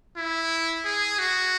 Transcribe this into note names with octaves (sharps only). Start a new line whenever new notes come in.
E4
G#4
F#4